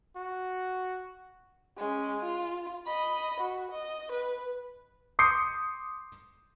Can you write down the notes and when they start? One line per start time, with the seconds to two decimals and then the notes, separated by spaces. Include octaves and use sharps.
0.16 F#4
1.78 G#3 C#4
2.20 F4
2.87 D#5 B5
3.40 F#4
3.71 D#5
4.12 B4
5.19 C6 D6 D#6 G6 C7 C#7